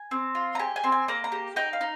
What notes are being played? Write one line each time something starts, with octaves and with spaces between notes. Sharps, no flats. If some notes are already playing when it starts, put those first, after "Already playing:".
Already playing: G#5
C4
F4
A#5
G4 G#5
G#5
C4
G#5
A#3 A#5
A#5
G4
D#4 G5
F5
D#4